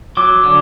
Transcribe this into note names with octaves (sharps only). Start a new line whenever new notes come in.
F#3 D6
D3